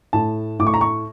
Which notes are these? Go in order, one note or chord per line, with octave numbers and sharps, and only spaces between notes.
A2 A5
A2 D6
C#6
A#5
C#6